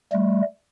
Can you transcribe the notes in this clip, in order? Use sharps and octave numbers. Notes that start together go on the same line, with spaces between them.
G3 A3